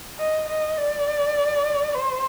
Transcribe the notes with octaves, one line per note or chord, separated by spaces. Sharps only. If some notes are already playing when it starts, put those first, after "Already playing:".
D#5
D#5
D5
C5